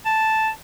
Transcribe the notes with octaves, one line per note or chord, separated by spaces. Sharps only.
A5